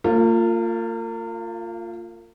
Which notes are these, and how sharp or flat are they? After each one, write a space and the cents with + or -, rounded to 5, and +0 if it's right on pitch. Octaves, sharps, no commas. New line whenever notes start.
A#3 -40 F4 +0